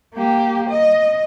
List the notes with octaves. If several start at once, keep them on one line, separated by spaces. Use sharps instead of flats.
A#3 G4
D#5